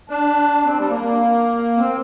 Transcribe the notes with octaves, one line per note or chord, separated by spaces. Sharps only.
D4
C4
G3
A#3
C4